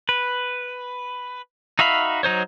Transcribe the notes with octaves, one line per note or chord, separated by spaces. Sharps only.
B4
D#4 F#4 E5 F5 B5
F#3 D#4 C5 C#5